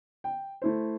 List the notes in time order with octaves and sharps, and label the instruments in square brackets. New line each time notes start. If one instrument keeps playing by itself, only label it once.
[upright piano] G5
A3 E4 C5